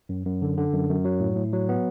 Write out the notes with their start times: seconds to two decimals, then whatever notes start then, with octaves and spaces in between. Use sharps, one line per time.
0.09 F#2
0.26 F#2
0.42 D3
0.57 D3
0.74 F#2
0.89 F#2
1.05 F#3
1.20 A2
1.36 A2
1.53 F#3
1.69 B3